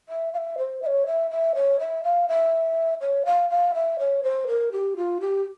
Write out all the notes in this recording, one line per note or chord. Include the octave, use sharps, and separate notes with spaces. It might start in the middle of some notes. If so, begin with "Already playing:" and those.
E5
F5
E5
C5
E5
C#5
E5
E5
C#5
E5
F5
E5
C#5
F5
F5
E5
C#5
C5
A#4
G4
F4
G4